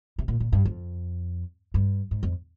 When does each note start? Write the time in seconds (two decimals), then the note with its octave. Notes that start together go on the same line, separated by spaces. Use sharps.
0.18 C3
0.28 A#2
0.40 A#2
0.53 G2
0.65 F2
1.74 G2
2.11 G#2
2.23 F2